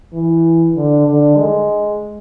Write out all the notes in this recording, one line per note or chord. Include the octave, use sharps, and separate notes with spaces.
E3
D3
D3
G#3